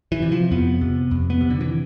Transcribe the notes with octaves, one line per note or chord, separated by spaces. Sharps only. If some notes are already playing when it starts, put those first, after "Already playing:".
E3
C3
F3
F2 B3
C3
F2
B3
C3
D3
E3